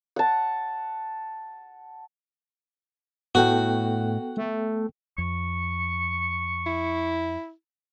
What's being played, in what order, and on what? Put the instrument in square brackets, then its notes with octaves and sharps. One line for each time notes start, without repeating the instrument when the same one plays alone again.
[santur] F#5 A5
[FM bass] A2 [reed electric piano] B3 A4 G5 [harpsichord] F#4
[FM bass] A3
[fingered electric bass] F2 [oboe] C#6
[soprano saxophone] E4